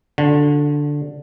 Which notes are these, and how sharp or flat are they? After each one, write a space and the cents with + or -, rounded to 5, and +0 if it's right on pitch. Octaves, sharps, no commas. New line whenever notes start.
D3 +0 F#4 -35